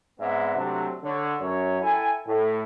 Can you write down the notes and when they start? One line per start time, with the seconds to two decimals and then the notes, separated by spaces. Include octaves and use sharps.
0.20 G#2 B3 C4 D5 E5 F#5
0.56 C3 F#3 A3 C4 D4
1.04 D3 C#5
1.40 F#2 C#5
1.81 E4 A4 G5 G#5
2.26 A2